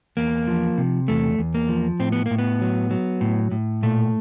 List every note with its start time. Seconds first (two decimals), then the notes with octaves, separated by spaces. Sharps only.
0.17 E2 A#3
0.47 F3
0.78 C3
1.08 E2 A3
1.38 E2
1.54 A#3
1.69 F3
1.99 A2 C4
2.12 B3
2.26 A2 A#3
2.38 B3
2.61 F#3
2.91 F#3
3.21 A2
3.51 A2
3.83 A#2 A3